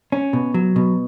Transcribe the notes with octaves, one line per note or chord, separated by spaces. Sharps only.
C#4
B2
F#3
B2